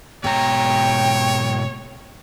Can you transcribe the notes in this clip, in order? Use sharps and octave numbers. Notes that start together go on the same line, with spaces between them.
G#2 B2 C#5 G5 A#5